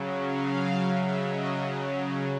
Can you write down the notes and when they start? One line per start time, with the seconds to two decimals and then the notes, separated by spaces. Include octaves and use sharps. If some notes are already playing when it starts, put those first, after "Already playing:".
Already playing: C#3 F#3
0.26 F5
0.93 C#3 F#3 E5
1.28 D#5